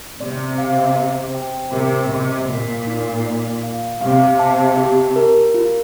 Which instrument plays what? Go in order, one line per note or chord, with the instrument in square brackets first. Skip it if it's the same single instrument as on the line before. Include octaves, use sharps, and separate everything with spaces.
[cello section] C3 [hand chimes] D5
[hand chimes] F5
C5
G5
[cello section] C3 [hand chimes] A#4
[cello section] C3 [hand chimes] D#5
[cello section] A#2 [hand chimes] A#4
[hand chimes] D#4
D5
F5
[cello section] C3 [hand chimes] F5
[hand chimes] A5
G4
A#4
F4